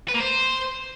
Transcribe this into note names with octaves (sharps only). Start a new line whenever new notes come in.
B4
A#3
C5